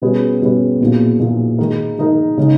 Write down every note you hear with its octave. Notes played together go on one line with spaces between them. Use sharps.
B2 G3 C#4 G#4 B4
B2 G3 C#4 G#4 B4
B1 A#2 A#3 E4 G#4
B1 A#2 A#3 E4 G#4
D#3 G#3 D#4 A#4
D#3 G#3 D#4 A#4
C#3 G#3 D#4